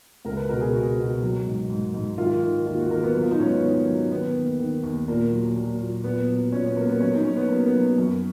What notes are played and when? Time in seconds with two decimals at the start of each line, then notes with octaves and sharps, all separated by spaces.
0.25 C#2 A#4
0.37 B4
0.49 B2 A#4
0.61 G#4
0.73 B2 F#4
0.98 B2
1.22 F#3
1.46 G#2
1.70 G#2
1.94 G#2
2.18 D#3 F4
2.43 D#3
2.66 D#2 F4
2.79 F#4
2.90 D#3 A#4
3.03 B3
3.14 F#3 A#3
3.23 F4
3.31 D#4
3.39 G#2 C#4
3.46 B3
3.63 D#3 C#4
3.87 F#3
4.11 D#3 B3
4.35 D#2
4.59 D#3
4.83 D#2
5.08 A#2 A#3
5.32 F#3
5.56 F#3
5.80 A#2
6.04 A#2 B3
6.28 F#3
6.52 A#2 C#4
6.65 B3
6.76 F#3 A#3
6.89 B3
7.00 F#3 C#4
7.13 D#4
7.25 F#3 C#4
7.37 B3
7.49 F#3 A#3
7.66 B3
7.74 F#3
7.98 F#2